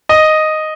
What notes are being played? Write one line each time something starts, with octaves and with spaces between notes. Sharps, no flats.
D#5